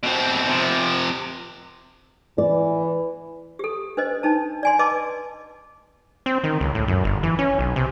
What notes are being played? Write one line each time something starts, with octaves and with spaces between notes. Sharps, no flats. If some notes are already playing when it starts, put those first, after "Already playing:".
B2 C4
C3 F3
E3 D5
G4 A4
D4 B4 C5 D#5
D4 D#4 A5
D5 G#5 C6
B4 D#5 A5 C6 D6
C4
D#3
C#2
A2
F#2
G1
E3
C#4
B1
C3